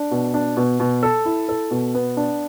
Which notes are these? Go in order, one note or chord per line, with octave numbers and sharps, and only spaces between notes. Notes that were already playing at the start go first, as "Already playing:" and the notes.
Already playing: D4
B2
D4
B2
B2
A4
E4
A4
B2
B3
D4